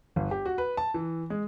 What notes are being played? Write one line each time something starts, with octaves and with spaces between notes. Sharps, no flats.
G1
G4
F#4
B4
A5
E3
G#3